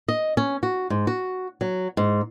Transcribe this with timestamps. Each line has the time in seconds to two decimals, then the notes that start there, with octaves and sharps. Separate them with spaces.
0.08 D#5
0.37 C#4
0.63 F#4
0.90 G#2
1.07 F#4
1.61 F#3
1.97 G#2